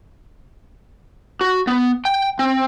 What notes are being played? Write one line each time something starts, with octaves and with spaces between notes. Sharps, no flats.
F#4
B3
G5
C4